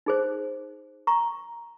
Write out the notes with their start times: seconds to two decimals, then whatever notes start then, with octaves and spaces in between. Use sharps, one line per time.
0.06 D#4 G#4 C5
1.07 A#5 C#6